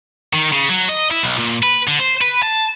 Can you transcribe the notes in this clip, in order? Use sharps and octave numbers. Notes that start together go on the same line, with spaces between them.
D#3
C#3
F#3
D#5
E4
B1
A#2
B4
D3
C5
B4
A5